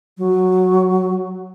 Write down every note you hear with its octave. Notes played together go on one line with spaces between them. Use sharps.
F#3